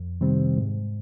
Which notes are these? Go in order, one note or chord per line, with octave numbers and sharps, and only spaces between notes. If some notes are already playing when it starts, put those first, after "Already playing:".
Already playing: F2
C3 D#3 G3 C4
G#2